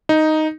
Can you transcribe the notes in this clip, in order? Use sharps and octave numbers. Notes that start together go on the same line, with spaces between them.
D#4